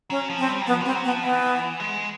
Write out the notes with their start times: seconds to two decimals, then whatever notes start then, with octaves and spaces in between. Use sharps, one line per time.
0.10 F#3 C#4
0.30 F3
0.38 C4
0.48 G3
0.62 F#3
0.67 F3 B3
0.81 G3 C4
0.95 F#3
1.05 B3
1.08 F3
1.23 E3 B3
1.80 G#3